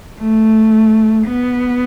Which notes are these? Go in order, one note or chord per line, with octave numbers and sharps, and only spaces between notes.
A3
B3